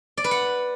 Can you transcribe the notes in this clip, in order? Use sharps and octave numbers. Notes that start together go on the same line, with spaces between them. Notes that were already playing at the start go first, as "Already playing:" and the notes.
D5
B4
F#5